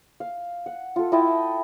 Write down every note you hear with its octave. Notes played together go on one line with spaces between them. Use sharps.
F5
F#5
F4 A4
E4 D#5 G5 A5